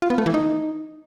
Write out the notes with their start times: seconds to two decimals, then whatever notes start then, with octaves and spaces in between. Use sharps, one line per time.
0.02 F4
0.10 B3
0.18 A3
0.26 E3
0.34 D#4